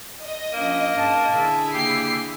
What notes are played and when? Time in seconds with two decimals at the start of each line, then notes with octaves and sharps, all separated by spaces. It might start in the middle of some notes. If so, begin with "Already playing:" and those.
0.23 D#5
0.53 F3 A#3 C#4 D4
0.98 G#2 A5
1.32 D3 E4 G#4
1.74 C#3 A#3 G4 C7